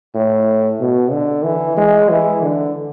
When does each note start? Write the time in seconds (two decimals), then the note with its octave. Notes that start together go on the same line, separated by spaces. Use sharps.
0.15 A2
0.80 B2
1.12 D3
1.44 E3
1.77 G#3
2.09 E3
2.42 D3